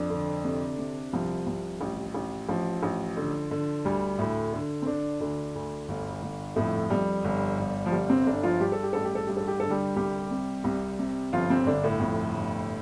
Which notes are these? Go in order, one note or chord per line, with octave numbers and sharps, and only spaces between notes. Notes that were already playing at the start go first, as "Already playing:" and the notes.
Already playing: F2 D4
D3
C3
C3
C2 F3
C2
A1
A1
A1 F3
A1
D3
D3
D2 G3
D2 A2 A3
D3
C4
D3 D4
D2 D3 D4
D2
G1
G1
F2 A2 A3
F2 G3
G1
G1
F3
G1 G3
C3 C4
G1 D3 D4
F3 F4
G2 G4
A4
G4
A1 A4
G4
A4
G2 G4
A4
G4
D3 A4
G3 G4
C2 G3 G4
C3
C2
C3
G1 F3 F4
C3 C4
G1 D3 D4
A2 A3
F2
G1